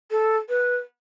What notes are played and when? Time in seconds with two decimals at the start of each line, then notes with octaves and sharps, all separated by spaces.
0.10 A4
0.49 B4